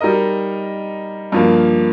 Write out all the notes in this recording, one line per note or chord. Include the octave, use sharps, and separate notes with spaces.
G3 D#4 A#4 D#5
G2 F3 A#3